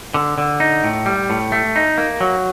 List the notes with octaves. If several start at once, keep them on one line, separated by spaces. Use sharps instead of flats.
D3
D3
D#4
A2
G3
A2
A3
D#4
A#3
F#3